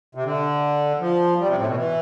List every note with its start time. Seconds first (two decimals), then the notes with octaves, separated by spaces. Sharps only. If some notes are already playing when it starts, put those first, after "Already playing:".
0.15 C3
0.24 D3
1.00 F3
1.39 G3
1.48 C3
1.57 A2
1.62 C3
1.67 B2
1.76 E3